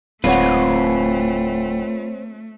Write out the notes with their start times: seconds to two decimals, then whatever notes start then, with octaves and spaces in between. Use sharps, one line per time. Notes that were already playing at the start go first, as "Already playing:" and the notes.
0.24 D1 A3 C4 F4 B4 C#5 F#5